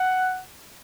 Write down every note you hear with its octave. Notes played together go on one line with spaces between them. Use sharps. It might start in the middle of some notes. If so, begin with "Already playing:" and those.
Already playing: F#5